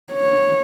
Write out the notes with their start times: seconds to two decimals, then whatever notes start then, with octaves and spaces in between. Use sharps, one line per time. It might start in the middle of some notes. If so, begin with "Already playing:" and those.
0.12 C#5